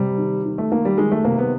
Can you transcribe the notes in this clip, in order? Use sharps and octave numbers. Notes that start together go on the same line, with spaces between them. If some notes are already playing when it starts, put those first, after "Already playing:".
Already playing: C3 G3
D#3
D#3
A3
D#3 A#3
G3
D#3 G#3
A3
C3 A#3
B3